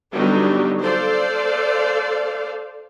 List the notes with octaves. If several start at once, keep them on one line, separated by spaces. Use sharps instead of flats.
D3 F#3 G3 B3 D4 D#4
A4 C5 D5 F5